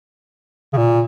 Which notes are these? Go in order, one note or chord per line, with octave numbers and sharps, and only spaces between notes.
C#3
A#2